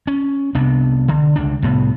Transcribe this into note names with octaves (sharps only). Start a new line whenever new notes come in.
C#4
C2 C3 B3 D4
D3
C#2 D4
C2 A2 B3